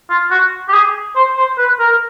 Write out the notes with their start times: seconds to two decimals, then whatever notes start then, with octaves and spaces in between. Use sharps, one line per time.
0.10 F4
0.31 F#4
0.68 G4
0.73 G#4
1.16 C5
1.37 C5
1.58 B4
1.79 A#4